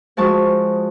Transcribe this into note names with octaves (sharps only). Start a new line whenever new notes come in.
F3 G#3 F#4 A5 C#6